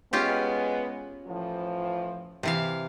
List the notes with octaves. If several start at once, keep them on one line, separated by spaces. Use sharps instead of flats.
G#3 B3 C#4 F4 G4
A2 E3 F3
C3 E3 F5